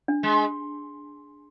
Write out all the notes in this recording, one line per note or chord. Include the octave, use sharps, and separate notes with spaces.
D4
G#3